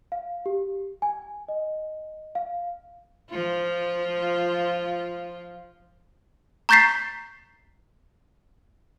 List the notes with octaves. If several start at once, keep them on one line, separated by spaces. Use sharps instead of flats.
F5
G4
G#5
D#5
F5
F3 F4
A#5 C#6 G6 A6 B6 C7